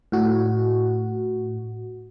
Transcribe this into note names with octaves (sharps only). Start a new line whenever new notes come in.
A2 F#4